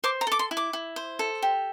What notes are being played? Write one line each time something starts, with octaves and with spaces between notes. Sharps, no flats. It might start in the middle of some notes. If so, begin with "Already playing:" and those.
C5 D6
A#5
A4 D6
C6
E4
D6
E4
C5
A4
G4